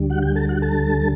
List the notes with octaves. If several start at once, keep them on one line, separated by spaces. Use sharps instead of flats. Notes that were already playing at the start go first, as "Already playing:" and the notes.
Already playing: D2 D3 G3
F#4 F#5
G4 G5
A4 A5
F#4 F#5
A4 A5